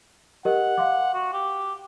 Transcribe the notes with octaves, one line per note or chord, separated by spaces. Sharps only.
G4 A#4 D#5 F#5
F5 C6 D6
F#4
G4